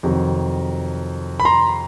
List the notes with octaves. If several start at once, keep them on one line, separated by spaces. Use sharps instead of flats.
F2 C3 D#3 F#3
B5
A#5 C6